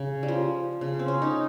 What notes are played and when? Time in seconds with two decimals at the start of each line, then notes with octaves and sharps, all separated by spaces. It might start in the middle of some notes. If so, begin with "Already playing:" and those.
Already playing: C#3
0.23 G3
0.28 F3
0.81 C#3
0.99 C4
1.08 C#4
1.22 D#4